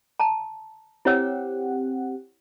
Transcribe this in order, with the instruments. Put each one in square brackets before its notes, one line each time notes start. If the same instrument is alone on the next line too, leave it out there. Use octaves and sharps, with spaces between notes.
[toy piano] A5 A#5
[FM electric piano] C4 G4 F#5 [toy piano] E4 C#5 E6